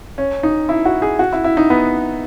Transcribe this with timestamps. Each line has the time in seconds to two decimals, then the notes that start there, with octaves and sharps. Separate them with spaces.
0.18 C#4
0.43 D#4
0.69 E4
0.85 F#4
1.02 G#4
1.19 F#4
1.33 E4
1.44 E4
1.57 D#4
1.70 B3